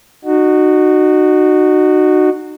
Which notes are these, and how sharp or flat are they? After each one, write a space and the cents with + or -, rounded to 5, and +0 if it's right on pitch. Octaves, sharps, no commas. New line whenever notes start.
D#4 -35 F#4 +0